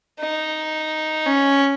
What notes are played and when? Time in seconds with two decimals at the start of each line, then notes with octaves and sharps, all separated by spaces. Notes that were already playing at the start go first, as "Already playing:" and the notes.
0.20 D#4
1.26 C#4